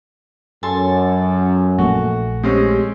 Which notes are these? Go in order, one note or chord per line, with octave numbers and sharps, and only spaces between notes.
F#2 C#4 A4 G#5 C6 A6
A#1 A3 F#4
G#3 C4 C#4 G4